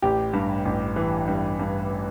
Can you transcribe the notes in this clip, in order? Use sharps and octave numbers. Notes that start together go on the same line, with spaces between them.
A1 G4
G2
A1
E3
G2
G2